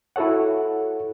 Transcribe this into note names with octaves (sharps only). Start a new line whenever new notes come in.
E4 F#4 A4 C#5 F#5